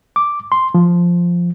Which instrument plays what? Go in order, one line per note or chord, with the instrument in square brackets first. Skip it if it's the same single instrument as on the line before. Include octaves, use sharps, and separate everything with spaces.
[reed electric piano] D6
C6
F3